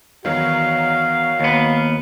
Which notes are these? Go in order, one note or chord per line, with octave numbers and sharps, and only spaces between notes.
E2 D#3 F#3 F#4 F5
D#2 B3